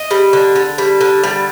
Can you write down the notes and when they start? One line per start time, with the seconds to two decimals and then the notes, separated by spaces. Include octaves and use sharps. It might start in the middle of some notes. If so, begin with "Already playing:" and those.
Already playing: D#5
0.11 G3
0.33 D3
0.56 D3
0.78 G3
1.01 D3
1.24 G3